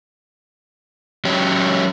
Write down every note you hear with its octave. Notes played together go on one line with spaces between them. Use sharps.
F#3 C#4 G4